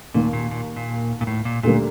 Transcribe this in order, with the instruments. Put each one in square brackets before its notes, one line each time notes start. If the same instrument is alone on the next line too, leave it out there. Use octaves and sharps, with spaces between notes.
[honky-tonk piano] D#2 D#3 A#3 [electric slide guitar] A#2
[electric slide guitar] A#2
A#2
A#2
A#2
A2
A#2
[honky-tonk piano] D2 D3 G3 A#3 [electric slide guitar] A#2